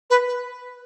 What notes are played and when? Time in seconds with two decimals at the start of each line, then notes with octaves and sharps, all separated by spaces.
0.10 B4
0.27 B4